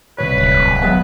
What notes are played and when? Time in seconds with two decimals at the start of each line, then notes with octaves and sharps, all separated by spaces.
0.18 C2 C3 B4 C#5
0.37 D1
0.82 F#3 G#3 B3